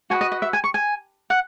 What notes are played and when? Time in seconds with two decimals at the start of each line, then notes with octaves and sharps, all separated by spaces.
0.10 F#4 B4 D#5 G#5
0.21 D#5
0.32 D#5
0.42 E5
0.53 G#5
0.64 C#6
0.74 G#5
1.30 F#5